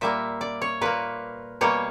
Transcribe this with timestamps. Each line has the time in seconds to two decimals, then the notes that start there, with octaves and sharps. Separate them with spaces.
0.01 A#2 G3 A#3 E5
0.41 D5
0.61 C#5
0.81 A#2 A#3 B4
1.61 B2 G3 A#3 C#5